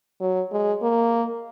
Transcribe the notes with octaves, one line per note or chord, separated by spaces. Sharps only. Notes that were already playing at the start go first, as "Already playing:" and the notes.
F#3
G#3
A#3